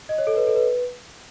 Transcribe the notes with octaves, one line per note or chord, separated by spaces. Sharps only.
D#5
C#5
A4
B4
A4
B4